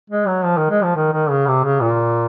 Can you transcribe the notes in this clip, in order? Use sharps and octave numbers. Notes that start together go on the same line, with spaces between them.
G#3
F#3
F3
D#3
G#3
F3
D#3
D#3
C#3
C3
C#3
A#2